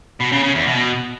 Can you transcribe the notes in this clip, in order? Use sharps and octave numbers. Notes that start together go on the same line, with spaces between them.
B2
C#3
C#3
E2
B2